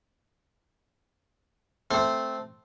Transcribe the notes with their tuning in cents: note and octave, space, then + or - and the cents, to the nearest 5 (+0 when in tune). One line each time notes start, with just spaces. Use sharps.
A3 +0 C4 +0 C6 +0